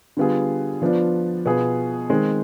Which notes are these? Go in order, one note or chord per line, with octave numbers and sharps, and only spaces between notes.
D3 G3 B3 F4 G#4
F3 B3 D4 F4
B2 B3 F4 G#4
D#3 G#3 C4